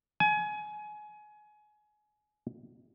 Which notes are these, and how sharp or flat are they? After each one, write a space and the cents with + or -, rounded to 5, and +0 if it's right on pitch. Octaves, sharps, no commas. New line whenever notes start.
G#5 +25